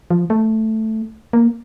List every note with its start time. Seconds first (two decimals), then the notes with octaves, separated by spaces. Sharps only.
0.10 F3
0.30 A3
1.33 A#3